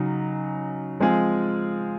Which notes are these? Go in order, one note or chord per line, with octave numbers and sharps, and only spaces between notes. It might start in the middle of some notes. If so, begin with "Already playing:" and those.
Already playing: C#3 F#3 D#4
F3 G#3 C4 F4 G#4